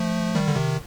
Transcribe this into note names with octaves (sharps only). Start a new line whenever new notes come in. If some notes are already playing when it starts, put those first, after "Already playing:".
Already playing: F3 A3
D#3 G3
D3
C3 D#3